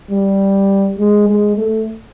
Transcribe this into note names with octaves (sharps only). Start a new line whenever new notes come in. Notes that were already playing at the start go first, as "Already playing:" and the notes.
G3
G#3
G#3
A3